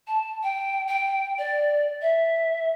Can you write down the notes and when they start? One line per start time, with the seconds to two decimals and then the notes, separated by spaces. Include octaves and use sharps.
0.07 A5
0.43 G5
0.88 G5
1.39 D5
2.02 E5